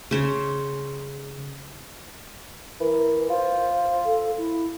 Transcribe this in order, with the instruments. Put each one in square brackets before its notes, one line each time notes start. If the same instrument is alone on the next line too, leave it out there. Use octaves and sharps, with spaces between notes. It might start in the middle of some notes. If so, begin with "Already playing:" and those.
[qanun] C#3 C5 C#5
[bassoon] E3 [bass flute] A#4
[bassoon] F4 [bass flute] C5
[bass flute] A4
E4